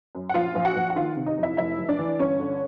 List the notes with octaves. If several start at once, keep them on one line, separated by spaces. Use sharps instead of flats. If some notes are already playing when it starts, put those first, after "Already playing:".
F#2
F#5
A#1 F4 F5
A#1
F#4 F#5
A#1
F#5
D#3 F4 F5
C3
D#4 D#5
F2
E4 E5
F1 E4 E5
F1
D4 D5
E3
G1 C#4 C#5
D3